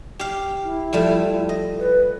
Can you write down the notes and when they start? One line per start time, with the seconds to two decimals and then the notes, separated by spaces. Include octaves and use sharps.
0.19 G4 F5
0.63 E4
0.93 F3 G3 A3
1.49 D#5
1.79 B4